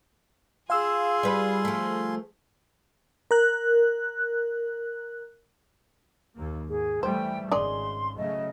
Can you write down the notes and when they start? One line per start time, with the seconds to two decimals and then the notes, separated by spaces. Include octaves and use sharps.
0.70 F4 G#4 F5 G#5 C6 E6
1.23 G3 B4
1.65 F3 A3
3.31 A#4 F#6
6.35 D#2 A#3
6.69 G#2 G#4
7.03 E3 G3 A3 C5 G5
7.52 G#1 C#3 G#3 G#4 D5 C6
8.17 C#3 F#3 A3 D#5